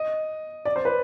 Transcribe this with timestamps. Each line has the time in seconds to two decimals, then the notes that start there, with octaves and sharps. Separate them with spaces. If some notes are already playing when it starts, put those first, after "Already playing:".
Already playing: D#5
0.65 D5
0.76 C5
0.85 B4